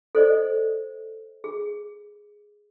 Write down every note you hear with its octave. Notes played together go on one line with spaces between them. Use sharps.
A4 C5 D5 D#5
G#4